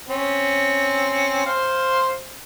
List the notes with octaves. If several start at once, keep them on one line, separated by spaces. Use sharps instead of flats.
C4 C#4
C5 F5